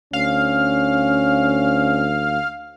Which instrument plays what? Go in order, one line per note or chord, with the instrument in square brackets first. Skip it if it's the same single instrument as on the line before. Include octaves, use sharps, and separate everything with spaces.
[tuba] D2 [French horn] C#4 [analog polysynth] F5